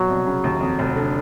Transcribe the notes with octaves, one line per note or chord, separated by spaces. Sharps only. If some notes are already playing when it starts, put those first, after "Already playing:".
Already playing: B2 F#3
C2
C#3
D#2
F2
F1
D3